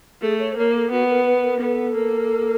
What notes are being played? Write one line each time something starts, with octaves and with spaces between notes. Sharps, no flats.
A3 G#4
C#5
C5
A#3 C#5
A4
B3 F#4
A#4
B4
A#4
B3 A4
A#3